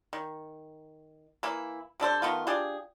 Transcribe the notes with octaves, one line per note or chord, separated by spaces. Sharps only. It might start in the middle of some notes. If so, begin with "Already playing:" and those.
D#3
E3 A#3 E4
C3 D4 A4 C5
D#3 A3 B3 F4
D4 F4 G4 G#4